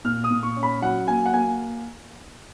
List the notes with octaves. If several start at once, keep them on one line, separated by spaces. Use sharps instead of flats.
A#2 F6
D#6
A#2
C#6
C#4
B5
F#3 F#5
A#3 G#5
F#5
A#3 G#5